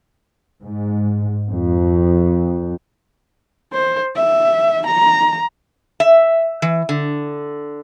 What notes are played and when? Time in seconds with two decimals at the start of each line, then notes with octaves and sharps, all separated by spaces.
0.64 G#2
1.50 F2
3.73 C5
4.16 E5
4.87 A#5
6.00 E5
6.62 E3
6.89 D3